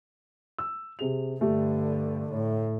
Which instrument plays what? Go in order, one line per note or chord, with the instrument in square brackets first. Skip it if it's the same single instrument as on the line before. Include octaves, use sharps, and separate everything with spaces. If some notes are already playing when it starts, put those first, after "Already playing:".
[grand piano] E6
C3 G#4 F7
[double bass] G2 D3 [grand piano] A3 G4
[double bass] A2 [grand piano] C#5